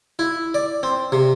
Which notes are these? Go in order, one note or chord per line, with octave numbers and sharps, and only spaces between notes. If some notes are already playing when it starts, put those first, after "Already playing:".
E4
D5
C4
C3